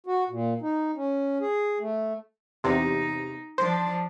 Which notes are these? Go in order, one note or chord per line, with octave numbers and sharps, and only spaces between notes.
F#4
A#2
D#4
C#4
G#4
A3
E2 C3 D#4
F3 D4 C5